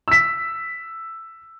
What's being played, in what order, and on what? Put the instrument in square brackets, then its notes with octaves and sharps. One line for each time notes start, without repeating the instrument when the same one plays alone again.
[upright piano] E6 B6